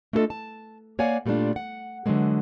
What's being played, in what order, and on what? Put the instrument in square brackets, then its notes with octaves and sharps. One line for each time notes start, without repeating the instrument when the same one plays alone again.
[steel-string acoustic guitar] A3 D4 F4 G#4 A4 D#5
A5
A#3 C#5 D5 F5 F#5 G#5
A#2 G3 A3 C4 D4 F4
F#5
D3 E3 F#3 G#3 A#3